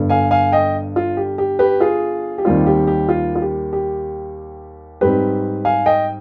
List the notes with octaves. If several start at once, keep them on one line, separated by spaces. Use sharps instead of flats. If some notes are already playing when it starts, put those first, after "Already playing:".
Already playing: G1 G2 D3
F5 G#5
F5 G#5
D#5 G5
F4
G4
G4
G4 B4
F4 G#4
G4
D#2 D#3 G3 C4 F4
G4
G4
F4
F4
G4
G4
G#2 G3 C4 G4 B4
F5 G#5
D#5 G5